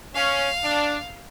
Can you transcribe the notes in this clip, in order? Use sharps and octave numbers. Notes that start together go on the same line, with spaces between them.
C#4 F5
D4